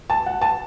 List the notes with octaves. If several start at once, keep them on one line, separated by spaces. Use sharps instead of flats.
A5
F#5
A5